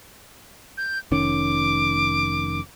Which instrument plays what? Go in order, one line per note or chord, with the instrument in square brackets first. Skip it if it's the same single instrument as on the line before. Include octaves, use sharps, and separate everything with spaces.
[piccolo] G6
[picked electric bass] F1 D#3 C#4 [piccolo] D6